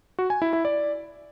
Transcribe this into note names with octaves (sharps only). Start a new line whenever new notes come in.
F#4
G#5
E4
E4
D5